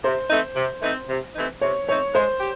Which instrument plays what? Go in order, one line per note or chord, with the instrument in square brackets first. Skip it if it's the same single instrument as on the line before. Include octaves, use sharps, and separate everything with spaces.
[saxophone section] C3 [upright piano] C5
[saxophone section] E3 A3 C4 D#4
C3
E3 A3 C4 D#4
C3
E3 A3 C4 D#4
[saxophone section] C3 [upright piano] C#5
[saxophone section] E3 A3 C4 D#4 [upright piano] C#5
[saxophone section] G#3 [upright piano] C5
[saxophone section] G4